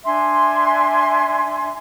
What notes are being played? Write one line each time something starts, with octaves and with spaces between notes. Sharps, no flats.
D4 E5 G#5 C6